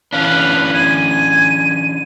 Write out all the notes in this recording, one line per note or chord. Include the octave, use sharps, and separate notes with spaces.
E3 C#4 D4 B4 F5
G#5 D#7